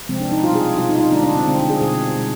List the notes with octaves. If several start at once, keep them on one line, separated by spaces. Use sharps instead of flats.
C3 F3 G#3 C4
D4
D#4
B2 G3 F4
G#4
B2 G3 F4
D#4
F4
D#4
D3 G#3 D4
D4
C4
D3 G#3 C4
D4
G#4
B2 G3 G#4
B2 G3